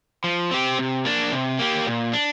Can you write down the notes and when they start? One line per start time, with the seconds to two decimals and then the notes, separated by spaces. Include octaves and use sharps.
0.24 F3
0.51 C4 G4
0.79 C3
1.05 A#3 D4
1.32 C3
1.59 A#3 G4
1.87 A#2
2.13 D4